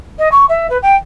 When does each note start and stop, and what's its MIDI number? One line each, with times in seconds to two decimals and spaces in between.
0.19 0.29 75
0.32 0.46 85
0.49 0.67 76
0.70 0.78 71
0.82 0.96 79